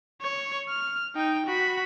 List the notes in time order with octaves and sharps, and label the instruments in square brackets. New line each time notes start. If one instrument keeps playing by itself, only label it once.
[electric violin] C#5
F6
D#4 G5
F#4 B5